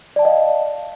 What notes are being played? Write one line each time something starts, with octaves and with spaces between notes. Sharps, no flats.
D5 D#5 F5 G5 A5